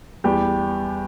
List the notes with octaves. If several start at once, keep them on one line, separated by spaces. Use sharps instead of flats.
E2 G3 G4